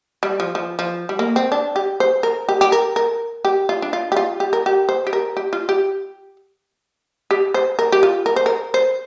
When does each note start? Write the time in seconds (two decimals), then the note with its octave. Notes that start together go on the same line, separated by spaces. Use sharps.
0.23 G3
0.40 F3
0.55 F3
0.79 F3
1.09 G3
1.19 A#3
1.36 C4
1.52 D4
1.76 G4
2.00 C5
2.23 A#4
2.49 G4
2.61 G4
2.72 A#4
2.96 A#4
3.45 G4
3.69 F4
3.82 D4
3.93 F4
4.12 G4
4.17 F4
4.40 G4
4.53 A#4
4.66 G4
4.89 C5
5.07 G4
5.13 A#4
5.37 G4
5.53 F4
5.69 G4
7.31 G4
7.54 C5
7.79 A#4
7.92 G4
8.03 F4
8.26 A#4
8.36 C5
8.46 A#4
8.74 C5